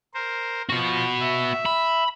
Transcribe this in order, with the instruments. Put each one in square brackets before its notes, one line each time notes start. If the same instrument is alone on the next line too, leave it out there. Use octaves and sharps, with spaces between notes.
[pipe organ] A#4 C5
[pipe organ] F3 [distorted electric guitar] B3 F#4
[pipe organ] E5
[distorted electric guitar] B5